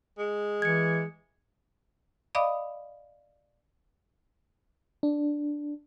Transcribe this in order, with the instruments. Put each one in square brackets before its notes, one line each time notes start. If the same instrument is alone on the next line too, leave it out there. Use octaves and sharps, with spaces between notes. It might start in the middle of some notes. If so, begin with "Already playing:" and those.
[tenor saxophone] G#3
[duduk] E3 [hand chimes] G#6 C#7
[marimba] D5 D#5 F5 B5 D6 D#6
[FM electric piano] D4